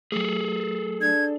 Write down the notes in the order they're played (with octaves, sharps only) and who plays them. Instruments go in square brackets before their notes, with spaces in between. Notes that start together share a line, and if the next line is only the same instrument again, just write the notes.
[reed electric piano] F#3 A3 [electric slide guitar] G#4 A4
[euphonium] D4 [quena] G#6